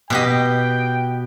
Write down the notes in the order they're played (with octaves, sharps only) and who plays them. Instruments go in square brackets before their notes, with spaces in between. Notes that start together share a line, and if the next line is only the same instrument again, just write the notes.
[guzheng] B2 G4 D#5 [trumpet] G5